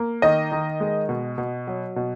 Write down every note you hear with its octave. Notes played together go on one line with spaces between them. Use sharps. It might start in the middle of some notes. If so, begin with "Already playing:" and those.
Already playing: A#3
D#3 D#5
D#3
G#3
B2
B2
F#3
B2